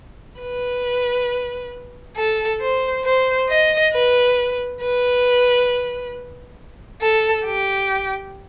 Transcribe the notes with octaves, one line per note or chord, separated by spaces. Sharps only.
B4
A4
C5
C5
D#5
B4
B4
A4
G4